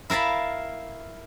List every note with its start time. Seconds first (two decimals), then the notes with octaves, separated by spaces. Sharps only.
0.10 E4 A#4 F5 A5 B5